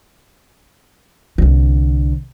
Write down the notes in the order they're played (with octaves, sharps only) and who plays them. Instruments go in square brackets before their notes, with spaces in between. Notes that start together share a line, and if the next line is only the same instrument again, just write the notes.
[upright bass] C2 D3